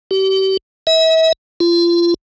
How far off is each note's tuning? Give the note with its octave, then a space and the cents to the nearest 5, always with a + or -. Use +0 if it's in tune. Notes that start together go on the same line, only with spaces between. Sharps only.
G4 -35
E5 -35
F4 -30